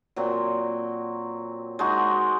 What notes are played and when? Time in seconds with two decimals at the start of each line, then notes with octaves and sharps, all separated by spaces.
0.16 A#2 F#3 C4
1.79 G#3 D#4 F#4